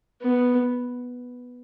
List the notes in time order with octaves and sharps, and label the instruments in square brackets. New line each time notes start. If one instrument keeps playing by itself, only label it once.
[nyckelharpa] B3